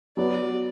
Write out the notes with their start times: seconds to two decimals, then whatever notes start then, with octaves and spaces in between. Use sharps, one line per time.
0.17 F#3 B3 F#4 D5